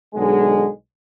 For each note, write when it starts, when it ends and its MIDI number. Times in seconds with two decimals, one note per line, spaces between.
0.14 0.69 35
0.14 0.69 50
0.14 0.69 56